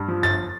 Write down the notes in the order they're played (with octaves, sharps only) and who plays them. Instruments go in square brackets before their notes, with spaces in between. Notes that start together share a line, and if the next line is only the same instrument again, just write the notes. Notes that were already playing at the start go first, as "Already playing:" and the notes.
Already playing: [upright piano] G2
F3
G1 A6